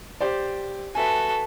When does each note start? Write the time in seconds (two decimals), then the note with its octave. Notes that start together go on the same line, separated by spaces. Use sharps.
0.21 G4 C5 D5
0.95 F#4 A4 B4 E5 G#5